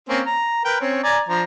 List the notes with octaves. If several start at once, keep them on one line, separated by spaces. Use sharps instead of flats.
A#3 C4 C#4
A#5
A#4 B4 G5
C4 C#4 C#5
D5 G#5 A#5
F3 D4 A#5